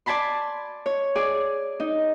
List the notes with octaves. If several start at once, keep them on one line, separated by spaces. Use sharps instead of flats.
D5 G#5 A5 B5 C6
C#5
G#4 D5 G#5
D#4